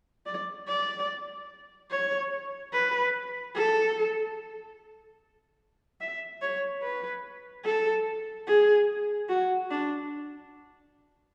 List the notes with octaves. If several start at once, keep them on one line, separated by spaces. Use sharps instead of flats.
D5
D5
C#5
B4
A4
E5
C#5
B4
A4
G#4
F#4
D4